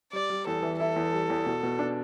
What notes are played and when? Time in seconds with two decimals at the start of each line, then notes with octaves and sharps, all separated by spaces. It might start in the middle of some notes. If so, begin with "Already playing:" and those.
0.12 G3 D5
0.30 G3
0.46 E2 A4
0.63 E3
0.80 E4 A4
0.96 E2
1.13 G3
1.30 E2
1.46 B2
1.63 B2
1.79 D4